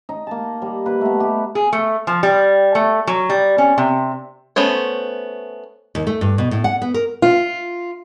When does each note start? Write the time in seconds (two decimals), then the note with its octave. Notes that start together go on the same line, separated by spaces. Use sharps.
0.09 D#4
0.27 A#3 A5
0.62 G3
0.86 A#3 B4
1.01 A3 B3
1.20 G4
1.55 G#4
1.73 A3
2.07 F3
2.23 G3
2.75 A3
3.07 F#3
3.30 G3
3.58 C#4
3.78 C3
4.56 A3 B3 C#4 C5 C#5
5.95 D#2
6.07 A3
6.21 G2
6.38 B2
6.51 A2
6.64 F#5
6.82 B3
6.94 A#4
7.22 F4